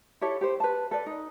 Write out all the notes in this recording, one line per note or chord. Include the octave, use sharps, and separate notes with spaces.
E4 G4 A4 C#5
G4 C5
B4 A5
A4 B4 D5
D#4